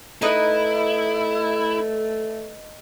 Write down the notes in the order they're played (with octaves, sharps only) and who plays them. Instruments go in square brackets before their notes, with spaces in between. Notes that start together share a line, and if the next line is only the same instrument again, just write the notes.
[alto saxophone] A3 [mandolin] D#4 B4 D#5 [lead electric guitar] E4